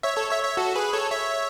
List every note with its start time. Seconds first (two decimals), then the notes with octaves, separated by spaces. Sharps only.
0.03 C#5 E5
0.17 A4 C#5
0.30 C#5 E5
0.43 C#5 E5
0.57 F#4 A4
0.75 G#4 B4
0.93 A4 C#5
1.11 C#5 E5